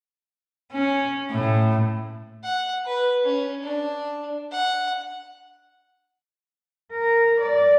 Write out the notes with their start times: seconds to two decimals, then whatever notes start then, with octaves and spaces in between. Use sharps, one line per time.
0.72 C#4
1.31 A2
2.44 F#5
2.86 B4
3.24 C#4
3.63 D4
4.51 F#5
6.92 A#4
7.41 D5